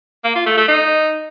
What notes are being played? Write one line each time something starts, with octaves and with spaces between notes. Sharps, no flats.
A#3
F4
A3
A3
D#4